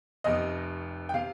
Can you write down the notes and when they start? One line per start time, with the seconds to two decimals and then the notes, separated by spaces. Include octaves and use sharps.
0.24 F1 F2 C3 D#5
1.09 G5
1.14 C3 F5